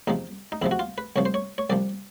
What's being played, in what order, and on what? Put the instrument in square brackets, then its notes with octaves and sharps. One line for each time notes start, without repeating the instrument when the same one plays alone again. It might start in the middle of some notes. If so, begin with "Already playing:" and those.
[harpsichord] E2 C3 F3 D#4
D#4
E2 C3 F3 E4
F#4
F4
B4
C2 C3 F3 C#5
C5
C#5
C#5
C2 C3 F3 D5